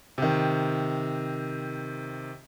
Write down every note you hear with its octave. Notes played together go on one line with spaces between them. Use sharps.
C3 D#3